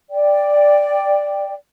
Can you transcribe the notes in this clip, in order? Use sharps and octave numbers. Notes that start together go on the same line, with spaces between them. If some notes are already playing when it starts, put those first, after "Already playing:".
D5 G5